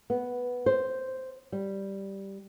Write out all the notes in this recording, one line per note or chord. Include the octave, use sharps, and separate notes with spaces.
B3
C5
G3